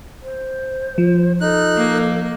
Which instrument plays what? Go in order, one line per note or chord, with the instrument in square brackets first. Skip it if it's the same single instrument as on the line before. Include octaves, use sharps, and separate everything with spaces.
[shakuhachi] C5
[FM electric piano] F3
[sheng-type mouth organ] D#4 F#6 [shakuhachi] A4
[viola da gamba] A#3